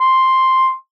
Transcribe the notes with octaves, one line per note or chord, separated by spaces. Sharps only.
C6